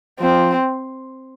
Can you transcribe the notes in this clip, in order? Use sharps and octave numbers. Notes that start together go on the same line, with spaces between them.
F3 C4